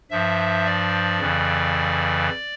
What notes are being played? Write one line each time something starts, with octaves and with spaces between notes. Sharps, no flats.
G2 F3 E5
D5
F2 C#3 E3